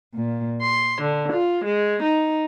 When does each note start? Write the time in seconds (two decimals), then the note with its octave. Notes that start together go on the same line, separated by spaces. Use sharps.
0.15 A#2
0.61 C6
1.00 D3
1.32 F4
1.64 G#3
2.03 D#4